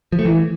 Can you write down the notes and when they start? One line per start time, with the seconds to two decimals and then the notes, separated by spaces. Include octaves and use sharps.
0.12 F3
0.19 A3
0.25 E3